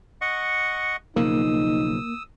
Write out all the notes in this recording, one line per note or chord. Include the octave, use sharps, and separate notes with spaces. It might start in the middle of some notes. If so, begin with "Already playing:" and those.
D#5 F#5 C#6
B1 C#3 F3 A#3 D#4 D#6 E6